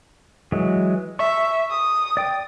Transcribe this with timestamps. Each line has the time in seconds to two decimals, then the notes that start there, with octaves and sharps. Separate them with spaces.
0.52 E3 F#3 G#3
1.19 E5 C#6
1.70 D#6
2.17 D5 G5